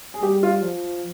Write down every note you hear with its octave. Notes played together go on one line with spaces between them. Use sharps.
G#4
G3 G4
F4
F3